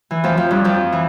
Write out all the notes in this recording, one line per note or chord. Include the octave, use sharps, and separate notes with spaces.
E3
F2 F3
F2 F3
G2 G3
F2 F3
E3